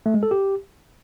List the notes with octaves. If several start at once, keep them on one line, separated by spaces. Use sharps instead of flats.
A3
G#3
A4
G4